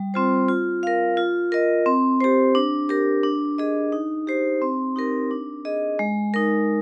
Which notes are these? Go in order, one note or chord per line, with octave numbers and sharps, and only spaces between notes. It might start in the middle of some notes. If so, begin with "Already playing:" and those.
Already playing: G3
C4 F4 C5
F4
A#4 F5
F4
A#4 D#5
C4
G4 C5
D4
G4 A#4
D4
G#4 D#5
D#4
G4 C5
C4
D#4 G4 A#4
D4
G#4 D#5
G#3
D#4 A#4